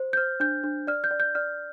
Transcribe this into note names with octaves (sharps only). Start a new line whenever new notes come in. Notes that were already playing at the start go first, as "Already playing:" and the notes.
Already playing: C5
G6
C5 F6
D4 G6
D4
D5 F6
G6
D5
G6
D5 F6